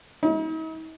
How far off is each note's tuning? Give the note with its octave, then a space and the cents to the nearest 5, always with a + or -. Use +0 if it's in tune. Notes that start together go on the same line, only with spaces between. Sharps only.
D#4 +45